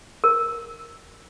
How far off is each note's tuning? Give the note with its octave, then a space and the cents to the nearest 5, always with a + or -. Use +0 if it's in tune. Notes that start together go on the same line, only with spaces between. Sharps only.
A#4 +0